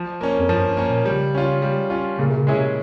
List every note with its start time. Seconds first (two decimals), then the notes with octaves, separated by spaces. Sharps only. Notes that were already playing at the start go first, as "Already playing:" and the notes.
Already playing: F3
0.21 A#3 C#4
0.39 F2
0.49 G2 F3
0.68 G2
0.77 A#3 C#4
0.87 A#2
1.05 C#3 G3
1.35 C#4 F4
1.62 G3
1.90 C#4 F4
2.19 A#2 C#3
2.30 C3
2.37 C#3
2.47 G#3 C#4 E4 G#4
2.57 C3